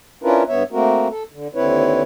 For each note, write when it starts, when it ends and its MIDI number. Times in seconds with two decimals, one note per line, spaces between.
0.23 0.43 61
0.23 0.43 62
0.23 0.43 64
0.23 0.43 65
0.23 0.43 70
0.23 0.43 71
0.48 0.63 43
0.48 0.63 59
0.48 0.63 73
0.48 0.63 76
0.72 1.08 57
0.72 1.08 58
0.72 1.08 60
0.72 1.08 66
0.72 1.08 70
1.10 1.23 69
1.32 1.48 50
1.55 2.03 39
1.55 2.03 50
1.55 2.03 60
1.55 2.03 64
1.55 2.03 71
1.55 2.03 73